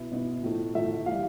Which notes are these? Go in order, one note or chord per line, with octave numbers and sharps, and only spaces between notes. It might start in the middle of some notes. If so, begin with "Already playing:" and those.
Already playing: B2 B3 E4
B2 B3 E4
A2 F3 A3
A2 F3 A3 E5
A2 E3 G3 F5